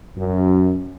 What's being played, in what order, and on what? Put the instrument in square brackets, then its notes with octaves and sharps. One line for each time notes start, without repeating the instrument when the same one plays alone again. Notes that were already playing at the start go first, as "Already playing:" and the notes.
[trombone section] F#2